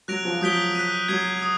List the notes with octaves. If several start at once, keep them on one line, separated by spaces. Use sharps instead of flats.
F#3 F#6 A#6 D7 F7
F3
F#3 D#6 G6 B6 D7 G7
F#6 B6 D#7
F#3 G#6 C7 D#7
D#6